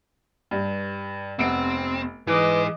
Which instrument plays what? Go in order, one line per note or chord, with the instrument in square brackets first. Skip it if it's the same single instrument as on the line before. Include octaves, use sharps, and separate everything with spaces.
[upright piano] G2
[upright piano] F1 B3 D7 [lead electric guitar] C4
[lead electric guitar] G#2 G#4 [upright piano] E3 [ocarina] B4 [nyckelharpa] D#5 D6